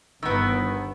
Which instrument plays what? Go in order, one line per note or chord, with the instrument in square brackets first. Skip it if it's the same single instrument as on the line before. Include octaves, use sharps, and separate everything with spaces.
[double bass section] G1 [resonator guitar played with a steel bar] D#3 B3 [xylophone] B4 E6